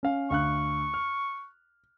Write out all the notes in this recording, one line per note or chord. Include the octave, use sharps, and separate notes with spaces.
C#4 F5
D2 F5 C#6 F#6
F6